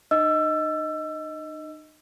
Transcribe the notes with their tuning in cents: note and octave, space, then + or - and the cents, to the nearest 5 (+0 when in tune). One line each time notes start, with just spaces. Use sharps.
D#4 -40 D#5 +15 E6 +25